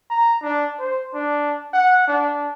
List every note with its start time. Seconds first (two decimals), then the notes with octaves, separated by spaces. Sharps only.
0.10 A#5
0.42 D4
0.79 C5
1.14 D4
1.73 F#5
2.07 D4